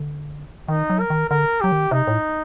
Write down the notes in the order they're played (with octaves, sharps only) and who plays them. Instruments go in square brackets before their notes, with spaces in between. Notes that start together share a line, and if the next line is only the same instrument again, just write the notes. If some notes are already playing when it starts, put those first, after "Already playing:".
Already playing: [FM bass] D3
[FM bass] D#3 [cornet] D#4
[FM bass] F#3
[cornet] A#4
[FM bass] D#3
[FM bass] D3 [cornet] A#4
[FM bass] F#3 [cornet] G4
[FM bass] D#3
[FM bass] C3 [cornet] D#4
[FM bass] A2